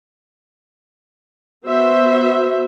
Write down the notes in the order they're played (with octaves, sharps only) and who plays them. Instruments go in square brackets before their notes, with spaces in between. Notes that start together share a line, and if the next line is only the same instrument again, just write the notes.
[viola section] B3 F#4 C5 E5